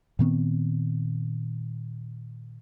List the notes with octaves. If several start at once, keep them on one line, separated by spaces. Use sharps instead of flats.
A#2 D#3 B3 C4